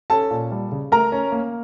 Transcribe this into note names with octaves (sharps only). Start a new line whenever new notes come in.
C#4 A4 A5
A#2
G3
C#3
A3 A#4 A#5
C#4
A#3